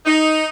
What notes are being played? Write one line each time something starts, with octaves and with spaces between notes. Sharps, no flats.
D#4